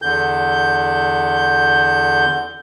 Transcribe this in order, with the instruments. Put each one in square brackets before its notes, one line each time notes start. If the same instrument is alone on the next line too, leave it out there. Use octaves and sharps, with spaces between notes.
[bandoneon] E2 D3 G6